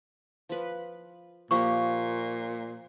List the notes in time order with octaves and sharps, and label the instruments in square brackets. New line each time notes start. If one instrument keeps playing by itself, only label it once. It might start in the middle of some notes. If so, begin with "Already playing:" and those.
[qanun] F3 B4
[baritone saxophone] A#2 [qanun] F3 A#3 G4 [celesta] C#6